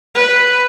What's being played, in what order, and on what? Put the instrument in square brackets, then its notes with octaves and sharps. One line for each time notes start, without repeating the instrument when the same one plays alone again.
[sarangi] B4